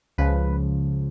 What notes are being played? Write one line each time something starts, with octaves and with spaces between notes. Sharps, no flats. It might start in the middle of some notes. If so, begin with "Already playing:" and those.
C#2 C#3 F3 B4